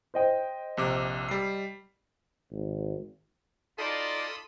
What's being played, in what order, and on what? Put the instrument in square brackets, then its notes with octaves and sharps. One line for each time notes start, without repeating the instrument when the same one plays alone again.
[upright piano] C5 D#5 G5
[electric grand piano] A#1 C3 D6
G3 C7
[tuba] G#1
[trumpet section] D#4 F4 D5 [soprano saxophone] A4 [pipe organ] B5 C6 D#6